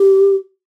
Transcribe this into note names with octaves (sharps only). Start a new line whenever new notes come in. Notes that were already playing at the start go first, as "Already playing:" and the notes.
Already playing: G4